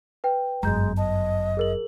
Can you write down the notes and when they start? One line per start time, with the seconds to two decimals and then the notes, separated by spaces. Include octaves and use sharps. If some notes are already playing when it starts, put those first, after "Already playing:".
0.24 B4 G5
0.63 G1 F#2 G#3 A#5 G6
0.97 D#5 A5
1.57 G#4 A#4 F#7